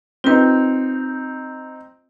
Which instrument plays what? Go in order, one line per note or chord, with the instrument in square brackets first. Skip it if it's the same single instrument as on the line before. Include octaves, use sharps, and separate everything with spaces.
[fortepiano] C4 D#4 [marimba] F4 B4